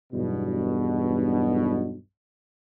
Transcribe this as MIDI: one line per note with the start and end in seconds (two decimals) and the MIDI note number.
0.13 1.97 35
0.13 1.97 40
0.13 1.97 43
0.13 1.97 47